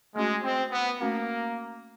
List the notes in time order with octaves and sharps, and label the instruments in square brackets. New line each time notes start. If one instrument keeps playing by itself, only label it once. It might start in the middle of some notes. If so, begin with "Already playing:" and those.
[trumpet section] G#3 [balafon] A3 C#4 F#4
[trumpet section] C4
B3
[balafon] A3 C#4 F#4 [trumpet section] A#3